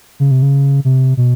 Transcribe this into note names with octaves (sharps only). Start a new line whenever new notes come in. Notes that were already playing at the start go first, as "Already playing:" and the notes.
C#3
C3
C#3
C3
B2